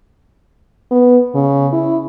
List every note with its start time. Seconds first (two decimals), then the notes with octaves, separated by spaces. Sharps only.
0.91 B3
1.35 C#3
1.73 E4